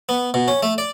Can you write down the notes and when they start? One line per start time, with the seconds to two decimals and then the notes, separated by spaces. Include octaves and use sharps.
0.09 B3
0.34 B2
0.48 C#4
0.63 A3
0.78 D5